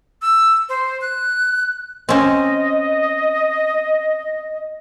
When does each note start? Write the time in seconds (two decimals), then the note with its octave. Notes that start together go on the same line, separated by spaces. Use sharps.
0.22 E6
0.69 C5
1.01 F#6
2.09 C4 C#4 D#5